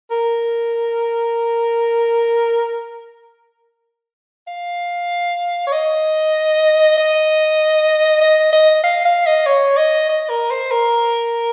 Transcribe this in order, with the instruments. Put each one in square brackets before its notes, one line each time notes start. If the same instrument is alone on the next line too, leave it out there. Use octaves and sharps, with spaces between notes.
[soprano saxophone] A#4
F5
C#5
D#5
D#5
D#5
D#5
F5
F5
D#5
C#5
D#5
D#5
A#4
C5
A#4